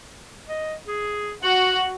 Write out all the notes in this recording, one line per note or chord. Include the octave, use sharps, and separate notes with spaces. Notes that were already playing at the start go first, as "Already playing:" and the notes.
D#5
G#4
F#4 F#5